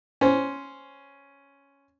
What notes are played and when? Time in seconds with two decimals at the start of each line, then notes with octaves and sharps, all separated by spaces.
0.21 C#4 C5